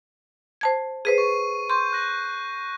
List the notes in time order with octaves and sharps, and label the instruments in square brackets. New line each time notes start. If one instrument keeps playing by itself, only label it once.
[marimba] C5 A5 G#6
[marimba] G#4 B4 C5 [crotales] C7 D#7
[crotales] C#6
[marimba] C6 [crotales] C#6 G6
[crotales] F#6 A#6